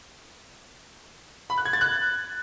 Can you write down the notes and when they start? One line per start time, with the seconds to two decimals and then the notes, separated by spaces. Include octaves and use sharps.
1.50 B5
1.58 F#6
1.65 G#6
1.73 A6
1.81 F#6